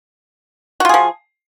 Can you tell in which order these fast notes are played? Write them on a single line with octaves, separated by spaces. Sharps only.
F#4 F4 G#4 F3